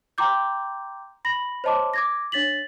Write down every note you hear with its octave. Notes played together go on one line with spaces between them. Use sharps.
G5 A#5 C6 D6 G6
B5 A#6 F#7
C5 C#5 D#5 A5 C6 D6
D6 G#6 A#6
D4 C#5 A6 B6 F#7